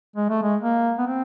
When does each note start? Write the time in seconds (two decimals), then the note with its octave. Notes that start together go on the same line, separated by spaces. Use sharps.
0.16 G#3
0.29 A3
0.42 G#3
0.61 A#3
0.98 B3
1.06 C4